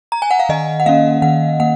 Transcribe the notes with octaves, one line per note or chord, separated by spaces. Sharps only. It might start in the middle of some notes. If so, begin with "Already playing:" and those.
A#5
G#5
F#5
F5
D#3 D#5
F#5
A#3 C#4 F5
D#3 F#5
A#3 F#5